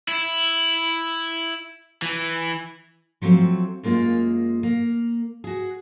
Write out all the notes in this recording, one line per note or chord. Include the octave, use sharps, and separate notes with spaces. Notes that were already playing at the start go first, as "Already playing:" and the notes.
E4
E3
F3 F#3 A3 C4
F#2 G#3 A#3 F4
A#3
F#4 G#4